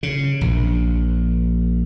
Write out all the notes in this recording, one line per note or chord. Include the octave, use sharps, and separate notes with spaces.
C#3
A#1